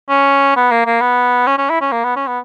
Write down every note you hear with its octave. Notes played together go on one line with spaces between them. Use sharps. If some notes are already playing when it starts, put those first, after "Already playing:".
C#4
B3
A#3
A#3
B3
C#4
C#4
E4
C#4
A#3
B3
C#4
B3